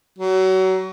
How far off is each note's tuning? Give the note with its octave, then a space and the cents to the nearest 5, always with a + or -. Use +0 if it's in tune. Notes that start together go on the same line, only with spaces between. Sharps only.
F#3 +30